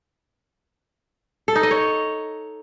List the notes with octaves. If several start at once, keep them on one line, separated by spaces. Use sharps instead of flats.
A4
D#4
D#5
C#5